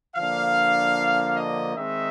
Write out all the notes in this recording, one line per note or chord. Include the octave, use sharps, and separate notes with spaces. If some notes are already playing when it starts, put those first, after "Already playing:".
D3 F3 A#3 D4 F5
D#5
D#3 G#3 C4 D#4 E5